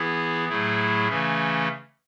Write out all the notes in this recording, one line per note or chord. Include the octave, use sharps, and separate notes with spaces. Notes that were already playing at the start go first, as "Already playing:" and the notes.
Already playing: E3 B3 E4 G#4
A2 F#3 A3 E4 G#4
C#3 E3 A3 C#4